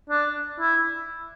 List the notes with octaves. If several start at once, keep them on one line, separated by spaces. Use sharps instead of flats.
D4
E4